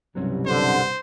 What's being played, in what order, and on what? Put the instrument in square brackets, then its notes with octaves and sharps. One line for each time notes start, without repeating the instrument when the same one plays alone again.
[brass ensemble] C2 G2 B2 [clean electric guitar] F#3 C4 C#4
[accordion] D3 [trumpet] C5